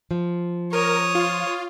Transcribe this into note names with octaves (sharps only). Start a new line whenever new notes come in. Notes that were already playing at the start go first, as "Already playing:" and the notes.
F3
A#4 C#5 D#6
F4